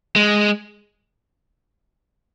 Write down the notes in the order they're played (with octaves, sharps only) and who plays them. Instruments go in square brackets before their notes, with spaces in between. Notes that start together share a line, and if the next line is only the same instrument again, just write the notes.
[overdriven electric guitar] G#3